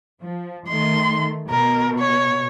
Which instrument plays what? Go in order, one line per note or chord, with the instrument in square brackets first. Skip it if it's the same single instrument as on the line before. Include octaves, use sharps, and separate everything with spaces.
[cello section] F3
[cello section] D#3 A3 [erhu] C6
[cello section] B2 [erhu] A#4
[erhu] C#5